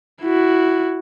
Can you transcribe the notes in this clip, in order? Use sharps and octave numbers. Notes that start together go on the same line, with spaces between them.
E4 F#4